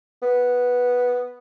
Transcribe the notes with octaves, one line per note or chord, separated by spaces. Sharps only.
B3